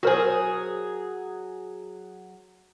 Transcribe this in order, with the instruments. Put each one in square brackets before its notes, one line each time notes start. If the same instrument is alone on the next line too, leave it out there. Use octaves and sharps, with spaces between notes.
[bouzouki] F#3 G#4 [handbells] F#4 A#4 C5